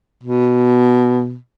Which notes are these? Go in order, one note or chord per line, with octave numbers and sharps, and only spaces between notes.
B2